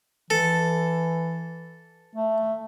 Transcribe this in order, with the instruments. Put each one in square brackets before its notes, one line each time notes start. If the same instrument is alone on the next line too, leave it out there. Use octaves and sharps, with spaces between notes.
[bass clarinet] E3 [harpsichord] A4
[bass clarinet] A3